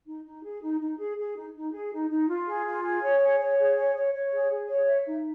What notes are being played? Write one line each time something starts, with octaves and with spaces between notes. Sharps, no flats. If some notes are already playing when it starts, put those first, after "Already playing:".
D#4
D#4
G#4
D#4
D#4
G#4
G#4
D#4
D#4
G#4
D#4
D#4
F4
G#4
F4
G#4
C#5
G#4
C#5
G#4
C#5
C#5
C#5
G#4
G#4
C#5
E5
D#4